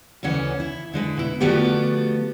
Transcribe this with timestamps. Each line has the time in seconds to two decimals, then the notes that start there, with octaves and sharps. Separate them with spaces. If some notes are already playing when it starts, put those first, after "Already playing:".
0.23 D2 C#3 E3 C#4 F#5
0.60 E4
0.93 D3 G#3 B4
1.17 B2 E4
1.40 D3 F3 A3 B3 F#4 G4